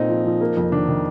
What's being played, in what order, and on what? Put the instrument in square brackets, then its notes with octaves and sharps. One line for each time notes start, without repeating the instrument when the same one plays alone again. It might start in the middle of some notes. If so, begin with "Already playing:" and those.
Already playing: [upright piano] A#2 C4 A4 [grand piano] D#4
[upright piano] F3
F3
A#3
F2
[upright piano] D#3 [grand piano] D4
[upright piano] D#3